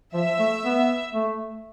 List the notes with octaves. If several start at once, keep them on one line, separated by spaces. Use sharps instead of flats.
F3 E5
A3
B3
A3